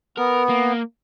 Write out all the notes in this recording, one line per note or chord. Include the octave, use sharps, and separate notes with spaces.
B3 A#4
A#3